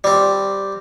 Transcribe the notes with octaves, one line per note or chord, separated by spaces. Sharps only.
G3 C4